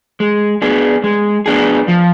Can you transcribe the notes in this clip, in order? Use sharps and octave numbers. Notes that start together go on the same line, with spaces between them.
G#3
B3 D4 G#4
G#3
B3 D4 G#4
F3